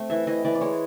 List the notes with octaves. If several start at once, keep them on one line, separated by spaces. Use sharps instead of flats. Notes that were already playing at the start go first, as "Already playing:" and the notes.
Already playing: A3 C4
E3 E5
E3 D#5
E3 D5
D5
G#3 C#5